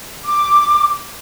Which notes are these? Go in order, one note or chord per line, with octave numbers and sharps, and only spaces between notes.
D6